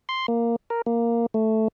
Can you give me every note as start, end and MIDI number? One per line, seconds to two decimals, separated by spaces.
0.09 0.26 84
0.28 0.56 58
0.70 0.82 70
0.86 1.26 58
1.34 1.68 57